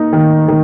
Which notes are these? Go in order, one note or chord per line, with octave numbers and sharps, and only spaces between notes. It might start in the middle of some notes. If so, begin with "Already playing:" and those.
Already playing: A#3 D#4
D#3
D#3